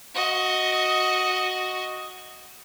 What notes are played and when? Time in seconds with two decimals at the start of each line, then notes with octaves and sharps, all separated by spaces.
0.14 F#4 D#5